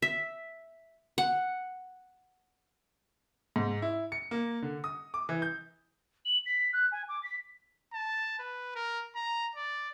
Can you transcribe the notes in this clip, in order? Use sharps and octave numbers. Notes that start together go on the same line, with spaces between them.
E5
F#5
G#2
E4
C#7
A#3
D3
D#6
D6
E3
G6
F#7
B6
F#6
G#5
D6
B6
A5
B4
A#4
A#5
D5